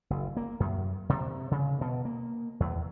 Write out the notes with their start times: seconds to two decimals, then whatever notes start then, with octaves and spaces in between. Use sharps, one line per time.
0.10 F#1
0.37 A#3
0.60 F#2
1.09 C3
1.51 C#3
1.81 B2
2.05 A#3
2.60 E2